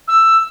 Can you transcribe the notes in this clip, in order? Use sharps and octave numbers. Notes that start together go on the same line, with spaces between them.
E6